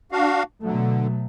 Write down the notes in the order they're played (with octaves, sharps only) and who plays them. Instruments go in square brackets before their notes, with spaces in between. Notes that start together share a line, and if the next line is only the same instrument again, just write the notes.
[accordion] D4 F#4 F5
[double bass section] B2 F#3 A3 [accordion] D3